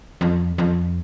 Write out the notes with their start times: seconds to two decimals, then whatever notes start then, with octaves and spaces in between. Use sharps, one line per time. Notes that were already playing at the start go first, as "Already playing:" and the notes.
0.21 F2
0.58 F2